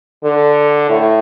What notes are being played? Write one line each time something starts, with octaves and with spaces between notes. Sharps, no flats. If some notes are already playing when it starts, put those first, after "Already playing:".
D3
A2